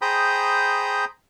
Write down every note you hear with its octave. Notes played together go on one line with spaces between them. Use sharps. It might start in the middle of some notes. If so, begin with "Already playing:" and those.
G#4 C5 G5 A#5 B5 D#6